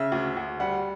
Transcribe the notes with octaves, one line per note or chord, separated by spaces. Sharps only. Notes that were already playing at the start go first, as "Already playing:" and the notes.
Already playing: C#3 E5
D2
D2
G3 F#5